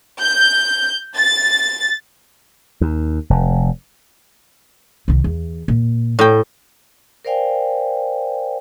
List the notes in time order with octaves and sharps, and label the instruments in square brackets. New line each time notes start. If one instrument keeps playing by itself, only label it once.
[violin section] G6
A6
[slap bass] D#2
F1
[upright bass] C2 D#3
E2
A#2
[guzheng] A2 G5
[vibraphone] A#4 C5 D5 F5 G5 G#5